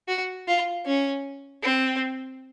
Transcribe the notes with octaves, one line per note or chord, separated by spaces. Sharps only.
F#4
F4
C#4
C4